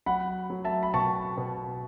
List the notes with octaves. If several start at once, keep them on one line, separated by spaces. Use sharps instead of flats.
F#3 F#5 B5
F#3
E5 A5
B5
B2 A5 C#6
B2